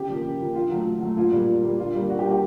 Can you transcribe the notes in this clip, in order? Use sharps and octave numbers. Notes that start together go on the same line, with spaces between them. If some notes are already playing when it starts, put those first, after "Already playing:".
Already playing: C#3 G4
F3 A#3
C#3
F3 A#3
D3 F4
F#3 A3
D3
F#3 A3
A#2 F4
G3 A#3
A#2
G3 A#3
D3 F4
G3 A#3
D3 F#4
G4
G3 A#3
G4